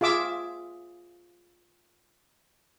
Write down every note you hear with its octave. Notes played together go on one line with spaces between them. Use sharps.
F4 G#4 E5 D6 E6